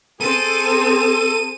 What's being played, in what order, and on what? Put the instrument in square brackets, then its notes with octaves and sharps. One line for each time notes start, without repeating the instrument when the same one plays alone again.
[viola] C4 G#4 [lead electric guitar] A4 [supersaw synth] D#7